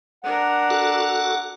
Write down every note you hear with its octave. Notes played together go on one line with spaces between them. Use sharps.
D4 A#4 F#5
F#4 A4